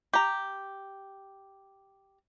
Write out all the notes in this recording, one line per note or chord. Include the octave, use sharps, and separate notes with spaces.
G4 A#5